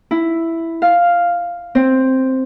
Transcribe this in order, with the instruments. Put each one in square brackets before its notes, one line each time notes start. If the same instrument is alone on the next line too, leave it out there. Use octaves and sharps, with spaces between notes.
[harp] E4
F5
C4